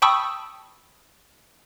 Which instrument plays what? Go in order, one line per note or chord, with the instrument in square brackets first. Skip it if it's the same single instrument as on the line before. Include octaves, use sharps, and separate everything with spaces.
[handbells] G5 A5 B5 C#6 D#6 E6